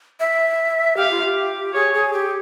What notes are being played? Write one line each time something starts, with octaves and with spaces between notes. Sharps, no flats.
E5
G4 F5
F4
G4
G#4 C#5
G#4
G4